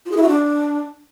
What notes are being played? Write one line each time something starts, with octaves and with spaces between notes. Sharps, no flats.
F4
G#4
E4
F#4
D4